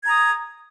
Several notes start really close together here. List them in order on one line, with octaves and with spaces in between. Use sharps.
G#6 A#5 D#6